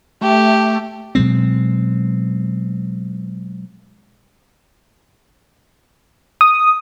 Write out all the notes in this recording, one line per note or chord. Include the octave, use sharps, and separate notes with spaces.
A3 G4
B2 F#3 G#3 C4
D#6